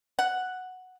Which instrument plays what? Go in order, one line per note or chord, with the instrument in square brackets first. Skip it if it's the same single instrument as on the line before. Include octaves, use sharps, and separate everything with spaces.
[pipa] F#5